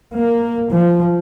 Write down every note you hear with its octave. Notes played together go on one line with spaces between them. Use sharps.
A#3
F3